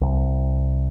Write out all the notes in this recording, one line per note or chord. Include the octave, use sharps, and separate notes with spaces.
C2